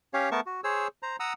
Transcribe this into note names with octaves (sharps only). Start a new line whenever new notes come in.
C#4 G4 C#5 F5
A3 B3 A#4 A5 C#6
F#4
G#4 C5 C#5 E6
C5 A#5
F#5 A#5 D#6 E6